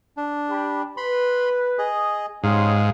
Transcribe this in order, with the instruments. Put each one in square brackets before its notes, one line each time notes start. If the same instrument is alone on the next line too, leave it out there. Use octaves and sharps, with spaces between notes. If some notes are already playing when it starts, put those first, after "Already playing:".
[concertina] D4
[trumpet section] G4 B5
[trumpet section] B4 [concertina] B5 C6
[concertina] G#4 D#5
[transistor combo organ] G#2 [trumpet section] C#4 G4 C6 [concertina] D#4 F5